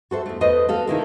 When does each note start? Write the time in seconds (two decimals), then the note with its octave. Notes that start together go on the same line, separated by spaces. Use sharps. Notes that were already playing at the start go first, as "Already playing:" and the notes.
0.11 F#4 A4 C5 E5
0.26 E2 A3
0.41 E2 A3 B4 C5 D#5
0.68 F#4 A4 F5
0.87 C3 D#3 E4 A4